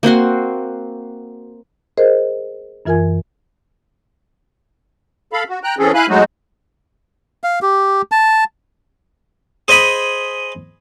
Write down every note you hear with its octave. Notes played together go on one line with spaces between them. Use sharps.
A#3 C4 F#4 C6
G#4 A#4 C5 D#5
F#2 E3 F4 A#4 G#5 G#6
A4 F5 B5
F#4
G5 A#5 F#6
E3 C4 C#4 G#4 A4
E4 F5 G#5 B5 F#6
F#3 G#3 A3 D#4 F#4
F5
G4
A5
G#4 C5 D#5 G#5 B5 D#6